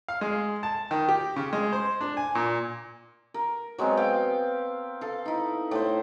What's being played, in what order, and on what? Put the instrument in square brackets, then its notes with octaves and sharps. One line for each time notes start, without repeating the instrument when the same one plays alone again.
[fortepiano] F5
G#3
A5
D#3
G4
C#3
G#3
C5
D4
G#5
A#2
[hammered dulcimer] A#4
F#3 G#3 B3 C4
F5 G5
A4 F5
D#4 E4
A2 C5